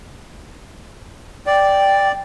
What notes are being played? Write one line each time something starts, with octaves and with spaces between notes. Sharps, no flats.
D5 G5